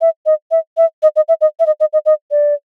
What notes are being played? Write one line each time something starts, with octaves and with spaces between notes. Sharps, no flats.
E5
D#5
E5
E5
D#5
D#5
E5
D#5
E5
D#5
D#5
D#5
D#5
D5